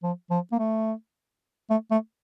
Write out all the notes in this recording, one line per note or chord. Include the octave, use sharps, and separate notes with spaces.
F3
F3
A#3
A3
A3
A3